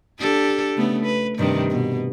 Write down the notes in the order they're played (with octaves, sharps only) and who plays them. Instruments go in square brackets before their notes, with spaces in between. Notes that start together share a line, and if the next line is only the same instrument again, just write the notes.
[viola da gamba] D4 G4 A4
C#3 A3 B3
B4
G2 C3 D#3
B2